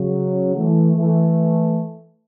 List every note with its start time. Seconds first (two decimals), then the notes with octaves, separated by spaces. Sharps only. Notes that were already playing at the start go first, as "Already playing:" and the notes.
Already playing: C#3 F#3
0.55 E3 A3
0.96 E3 A3